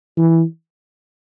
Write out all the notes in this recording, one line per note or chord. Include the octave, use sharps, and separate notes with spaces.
E3